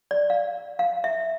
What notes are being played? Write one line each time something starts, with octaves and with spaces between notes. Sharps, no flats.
D5
F5
F5
E5